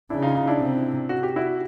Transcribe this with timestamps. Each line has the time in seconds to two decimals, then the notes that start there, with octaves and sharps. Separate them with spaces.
0.10 C#3 D4 E4
0.22 D#4 F4
0.35 D#4 F4
0.47 D4 E4
0.59 C3
1.09 F#4
1.23 G4
1.36 E4 F#4